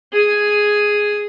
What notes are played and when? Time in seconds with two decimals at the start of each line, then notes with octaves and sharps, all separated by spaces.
0.13 G#4 G#5